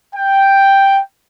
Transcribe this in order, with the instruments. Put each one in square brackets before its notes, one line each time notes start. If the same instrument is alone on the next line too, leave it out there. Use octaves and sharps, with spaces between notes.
[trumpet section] G5